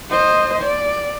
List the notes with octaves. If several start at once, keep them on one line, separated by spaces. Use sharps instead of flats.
C5 D#5
D5